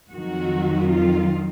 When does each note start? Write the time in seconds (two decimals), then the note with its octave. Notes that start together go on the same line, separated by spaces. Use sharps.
0.11 F2 D#3 F#3 F#4
0.91 F4